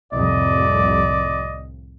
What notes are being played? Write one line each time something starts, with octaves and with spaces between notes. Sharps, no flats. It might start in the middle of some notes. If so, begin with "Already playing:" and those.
C2 F2 A2 D5 D#5